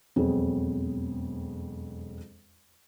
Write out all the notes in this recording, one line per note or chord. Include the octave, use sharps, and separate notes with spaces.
E1 F2 F#3 B3 C4 G#4